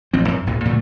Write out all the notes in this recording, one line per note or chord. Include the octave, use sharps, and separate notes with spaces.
A1 F3 C4
F#2
G#1 D#2 A#2
A#2 D3 D#3 A3